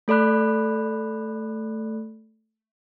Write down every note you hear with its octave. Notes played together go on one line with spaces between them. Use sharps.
A3 A4 D5 B5 F#6